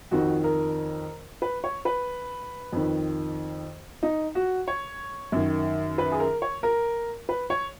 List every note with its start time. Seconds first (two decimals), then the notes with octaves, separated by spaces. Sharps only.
0.11 F2 D#3 F#4
0.44 A#4
1.42 B4
1.64 C#5
1.85 B4
2.73 F2 D#3
4.03 D#4
4.35 F#4
4.68 C#5
5.32 F#2 D#3
5.98 B4
6.12 G#4
6.20 A#4
6.42 C#5
6.63 A#4
7.29 B4
7.50 C#5